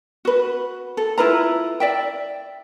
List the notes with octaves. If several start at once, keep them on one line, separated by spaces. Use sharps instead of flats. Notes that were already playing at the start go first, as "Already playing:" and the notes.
F#4 B4
A4
E4 F4 B4 A#5
D5 E5 G5